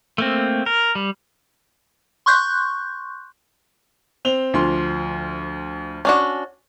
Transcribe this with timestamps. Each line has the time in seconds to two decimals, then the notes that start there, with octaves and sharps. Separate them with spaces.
0.18 A3 A#3 C4
0.66 A#4
0.95 G3
2.26 C6 C#6 F#6 G6
4.25 C4 F7 G7
4.54 D2 F3 C6
6.05 C#4 D4 F#4